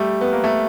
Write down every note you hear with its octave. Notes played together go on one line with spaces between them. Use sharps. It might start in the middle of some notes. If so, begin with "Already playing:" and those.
Already playing: G3 A3
B3
A#3
A3